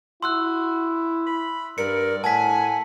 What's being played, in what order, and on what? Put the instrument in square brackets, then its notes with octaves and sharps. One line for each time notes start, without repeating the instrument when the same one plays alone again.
[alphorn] E4 [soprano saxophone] F#4 [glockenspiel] C6 E6 F#6
[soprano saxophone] B5
[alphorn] G2 [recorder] A#4 [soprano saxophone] D5 [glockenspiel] C#7
[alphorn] A2 [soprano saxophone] F#5 [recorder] G#5 [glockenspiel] A5 B6